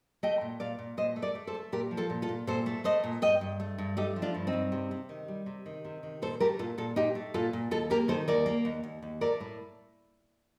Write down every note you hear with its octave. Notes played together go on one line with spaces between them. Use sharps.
A3 D#5 G5
A#2
A#2 D5 F5
A#2
A#2 C5 D#5
A3
A#4 D5
A3
A4 C5
A3
A#2 G4 A#4
F3
F4 A4
A#2
F4 A4
A#2
A#2 A4 C5
A3
A3 C5 D#5
A#2
G2 D#5 G5
G2
A3
G2
A3 D#4 G4
F3
D4 F4
G2
C4 D#4
G2
C3
C3
D#3
G3
C3
D#3
C3
D#3
A#2 A4 C5
A3 G4 A#4
A#2 F4 A4
A#2 F4 A4
A#2 D#4 G4
A3
A#2 F4 A4
A#2
D#2 F4 A4
A#3 G4 A#4
D#3 A4 C5
D#2 A#4 D5
A#3
D#2
D#2
D#2
A3 A#4 D5
A2